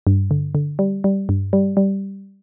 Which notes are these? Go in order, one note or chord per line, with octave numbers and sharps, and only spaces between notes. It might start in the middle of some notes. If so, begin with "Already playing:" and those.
G2
D3
D3
G3
G3
G2
G3
G3